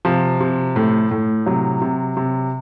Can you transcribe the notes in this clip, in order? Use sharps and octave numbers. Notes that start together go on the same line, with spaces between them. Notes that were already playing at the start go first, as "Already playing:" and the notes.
C3 F3
C3
A2
A2
C3 F#3
C3
C3